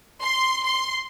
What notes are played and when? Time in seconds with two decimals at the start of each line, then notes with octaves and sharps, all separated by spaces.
0.23 C6
0.65 C6